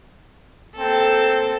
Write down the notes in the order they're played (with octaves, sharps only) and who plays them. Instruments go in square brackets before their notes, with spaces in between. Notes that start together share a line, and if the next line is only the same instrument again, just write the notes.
[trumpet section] A#3 C4 [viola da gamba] A4